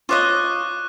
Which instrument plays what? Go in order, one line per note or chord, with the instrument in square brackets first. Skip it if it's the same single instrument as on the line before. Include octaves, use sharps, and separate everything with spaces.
[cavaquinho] F4 C#5 D#5 [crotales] C#6 D6 F#6